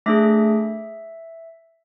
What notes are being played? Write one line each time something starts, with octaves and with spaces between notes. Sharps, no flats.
A3 D4 G#4 E5